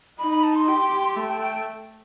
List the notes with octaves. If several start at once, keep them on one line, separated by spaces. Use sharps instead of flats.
D#4 B5
B5
A5
C6
G4
A3
G5
G5